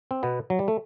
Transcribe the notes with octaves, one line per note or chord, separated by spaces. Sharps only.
C4
B2 B3
F#3
G3
A3